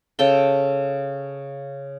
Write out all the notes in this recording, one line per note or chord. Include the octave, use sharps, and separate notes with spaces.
C#3 A4 G5